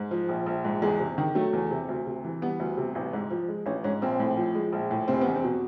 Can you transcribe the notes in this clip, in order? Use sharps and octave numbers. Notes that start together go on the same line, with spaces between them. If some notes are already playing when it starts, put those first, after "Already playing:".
Already playing: G#2
F3
A#1
A#1
G#2
E2 G#3
C3
D#3
F#3 A3
E2
C3
D2
C3
E3
G3 B3
D2
C3
A1
G#2
F3
G#3
A1 C#4
G#2 C#4
A#1 C4
A2
F3
G#3
A#1
A2
F1 C4
E2 B3
C4
B2